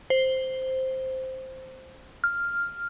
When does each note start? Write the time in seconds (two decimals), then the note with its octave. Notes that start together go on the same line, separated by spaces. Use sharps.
0.10 C5
2.24 F6